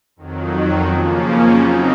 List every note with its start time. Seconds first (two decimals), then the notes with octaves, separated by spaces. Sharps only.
0.16 F2 D#3 F#3
0.85 C#3 F3 A#3 C#4
1.54 C#3 F#3 C4 D#4